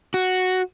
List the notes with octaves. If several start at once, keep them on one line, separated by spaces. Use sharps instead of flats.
F#4